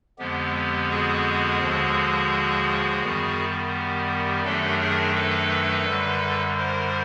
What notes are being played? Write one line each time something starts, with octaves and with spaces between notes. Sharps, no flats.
F2 D3 F3 G#3 B3 G4
G4
F#4 G#4
D#2 D3 F3 G#3
F#2 D#3 G3 B3
G4
G4
F#2 D#3 F#3 A3 D4 G4 A4
G#4 A#4
A4 B4
F#2 D3 G3
A#4 C5